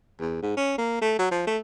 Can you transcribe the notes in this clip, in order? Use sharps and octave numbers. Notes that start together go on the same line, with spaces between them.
E2
G#2
C#4
A#3
A3
F#3
F3
A3